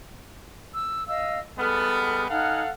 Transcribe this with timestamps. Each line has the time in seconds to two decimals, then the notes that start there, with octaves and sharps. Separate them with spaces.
0.73 E6
1.08 D#5 F5 E6
1.58 G3 G#3 B3 A4 F6
2.30 D#4 A4 F5 F#5 G#5 F6